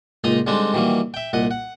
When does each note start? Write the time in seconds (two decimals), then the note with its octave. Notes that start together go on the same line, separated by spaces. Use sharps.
0.24 C#2 A#2 D#4 D#5 A#5
0.47 D3 G3 G#3 C4 D4 D#4
0.74 D#3 E3 F#3 G3 A#3
1.14 E5 G5
1.33 C2 A#2 D#5 F#5
1.51 F#5